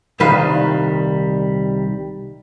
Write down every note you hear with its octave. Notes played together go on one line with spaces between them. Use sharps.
C2 A#2 D#3 G3 B4 F5